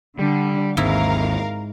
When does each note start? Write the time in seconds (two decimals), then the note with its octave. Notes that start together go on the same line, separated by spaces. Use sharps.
0.19 D3 G3
0.77 G#1 D#2 G#2 C4 E4 A#4 F5